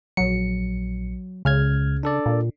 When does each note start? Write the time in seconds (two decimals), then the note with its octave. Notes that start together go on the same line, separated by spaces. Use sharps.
0.17 A#1 F#3 C#7
1.45 C#2 C#3 F6 G#6
2.03 D4 A4 D5
2.26 A#2